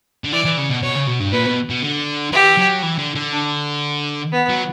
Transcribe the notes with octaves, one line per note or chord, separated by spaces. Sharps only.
D3
E3 D5
E3
C#3
B2
B2 C#5
C#3
B2
G2
A#2 B4
B2
B2
D3
E3 G4
F#3
E3
D3
D3
D4
B3
F#3